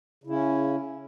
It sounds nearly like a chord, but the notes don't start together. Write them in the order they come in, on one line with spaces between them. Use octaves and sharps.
C#3 E4 C#4